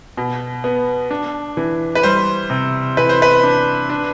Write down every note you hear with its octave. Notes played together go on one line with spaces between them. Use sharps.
B2
B3
D4
E3
B4
G3 C5
C3
E3 B4
C5
B4
D4
D4